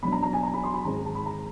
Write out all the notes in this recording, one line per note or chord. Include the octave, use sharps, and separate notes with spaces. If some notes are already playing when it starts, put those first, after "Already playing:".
B2 F#3 B3 D4 B5
A#5
A#5
G#5
A#5
B5
C6
B5
G#2 D#3 G#3 C4 D#4 A#5
A5
B5
A#5